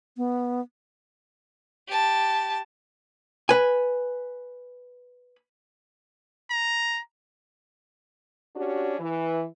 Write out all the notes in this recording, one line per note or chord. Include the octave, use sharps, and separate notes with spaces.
B3
G4 A5
B4 G#5
A#5
C#4 D4 F#4 G4
E3